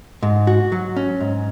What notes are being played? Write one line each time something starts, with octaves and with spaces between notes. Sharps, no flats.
G#2
F#4
F#3
C#4
G#2